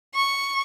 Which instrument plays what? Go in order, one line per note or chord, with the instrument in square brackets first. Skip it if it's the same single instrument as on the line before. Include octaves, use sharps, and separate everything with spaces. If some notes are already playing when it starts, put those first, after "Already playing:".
[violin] C#6